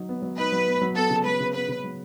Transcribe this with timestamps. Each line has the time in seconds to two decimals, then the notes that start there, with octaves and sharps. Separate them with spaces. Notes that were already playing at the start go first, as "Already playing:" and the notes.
Already playing: F#3 D#4
0.09 B3
0.22 F#3
0.38 D#4 B4
0.52 F#3
0.67 B3
0.82 F#3
0.95 B3 A4
1.10 C#3
1.25 F#3 B4
1.40 C#3
1.54 B3 B4
1.69 C#3
1.84 F#3